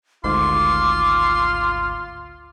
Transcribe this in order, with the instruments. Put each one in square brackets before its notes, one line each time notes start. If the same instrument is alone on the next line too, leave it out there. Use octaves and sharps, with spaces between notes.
[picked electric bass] G#1 D2 G#2 [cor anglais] F4 [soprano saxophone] C6 [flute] D6